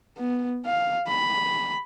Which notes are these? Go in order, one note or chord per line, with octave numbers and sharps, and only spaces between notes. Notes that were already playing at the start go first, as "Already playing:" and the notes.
B3
F5
B5